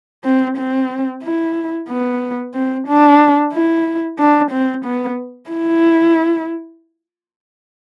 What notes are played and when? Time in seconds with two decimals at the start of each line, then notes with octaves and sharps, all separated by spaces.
0.24 C4
0.57 C4
1.23 E4
1.88 B3
2.54 C4
2.87 D4
3.53 E4
4.18 D4
4.51 C4
4.85 B3
5.50 E4